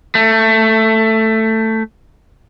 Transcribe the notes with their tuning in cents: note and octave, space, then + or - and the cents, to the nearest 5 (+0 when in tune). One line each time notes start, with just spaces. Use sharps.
A3 +10